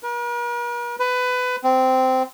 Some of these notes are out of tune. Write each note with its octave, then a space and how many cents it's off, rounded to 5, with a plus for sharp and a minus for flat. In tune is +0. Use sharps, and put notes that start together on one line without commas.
A#4 +45
B4 +20
C4 -10